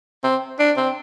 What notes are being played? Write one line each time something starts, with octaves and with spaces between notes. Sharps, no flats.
C4
D4
C4